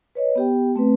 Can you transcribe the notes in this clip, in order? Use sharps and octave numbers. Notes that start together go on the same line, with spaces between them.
B4 C#5 D#5
B3 G4 G5
A3 C4 B4